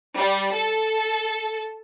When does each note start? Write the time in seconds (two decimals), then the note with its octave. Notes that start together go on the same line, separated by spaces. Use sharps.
0.16 G3
0.55 A4